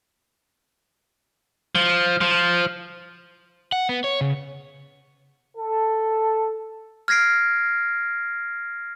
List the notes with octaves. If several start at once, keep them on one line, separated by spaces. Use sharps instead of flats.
F3
F3
F#5
B3
C#5
C#3
A4
F6 G#6 A#6 C7 D7